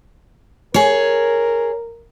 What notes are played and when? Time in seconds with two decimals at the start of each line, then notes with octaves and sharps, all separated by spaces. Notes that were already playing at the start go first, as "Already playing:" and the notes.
0.74 G#4 A#4 C#5